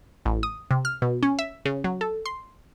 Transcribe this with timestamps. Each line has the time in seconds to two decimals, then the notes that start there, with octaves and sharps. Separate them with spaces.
0.26 A1
0.43 D#6
0.71 C3
0.85 F6
1.02 B2
1.23 C#4
1.39 E5
1.66 C#3
1.84 F#3
2.01 A4
2.26 C6